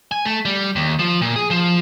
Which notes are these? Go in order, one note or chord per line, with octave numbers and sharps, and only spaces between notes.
G#5
A3
G3
D#2
F3
A#2
G#4
F3